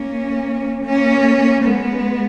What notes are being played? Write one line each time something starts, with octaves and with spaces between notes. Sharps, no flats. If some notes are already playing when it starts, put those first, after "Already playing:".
Already playing: A#3 C#4
A#3 C#4
G#3 B3